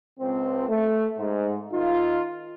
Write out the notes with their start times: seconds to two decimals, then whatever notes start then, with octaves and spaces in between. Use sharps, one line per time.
0.19 C#2 C4
0.68 A3
1.17 G#2
1.71 D#3 D#4 F4